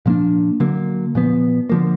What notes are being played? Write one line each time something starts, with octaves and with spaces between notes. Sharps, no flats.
A#2 F3 A#3 D4
D3 F#3 A#3
A#2 F3 B3
D3 F3 A#3